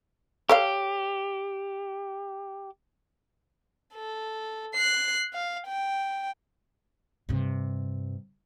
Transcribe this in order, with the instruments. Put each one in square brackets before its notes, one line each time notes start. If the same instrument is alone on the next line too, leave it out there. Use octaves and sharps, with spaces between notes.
[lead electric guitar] G4 [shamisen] A4 C#5 F5
[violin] A4
F#6 C7
F5
G5
[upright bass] G2 C3